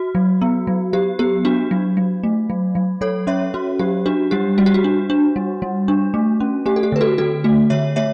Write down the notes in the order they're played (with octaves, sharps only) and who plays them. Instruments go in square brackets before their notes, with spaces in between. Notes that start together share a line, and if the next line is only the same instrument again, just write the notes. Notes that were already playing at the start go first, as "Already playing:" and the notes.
Already playing: [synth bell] F#4
F#3
B3
F#3
F#3 G4
B3 G4
D4 F#4
F#3
F#3
A3
F#3
F#3
F#3 A4 C#5
C#4 C#5 E5
C#4 F#4
F#3 G4
D4 F#4
G3 G4
G3 F#4
G4
F#4
D4
D4
G3
G3
D4
A3
C#4
A3 G4
A4
G4
D3 B4
F#4 A4
D3 F#4 A4
A3 F#4
D3 C#5 E5
A3 C#5 E5